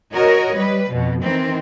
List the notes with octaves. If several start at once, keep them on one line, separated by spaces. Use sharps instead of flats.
F#4 A#4 C#5 D#5
G3 B4
F2 B2
D#3 E3 C4